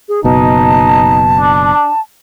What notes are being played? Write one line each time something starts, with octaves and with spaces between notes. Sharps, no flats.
G#4
F#1 B2 D#4 A5
D4